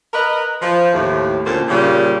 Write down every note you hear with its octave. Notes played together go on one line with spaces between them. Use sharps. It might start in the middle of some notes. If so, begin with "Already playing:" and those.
A#4 B4 D#5
F3
D#2 A2
D2 A#2 D3 C#4 A4 C5
A#2 C#3 G3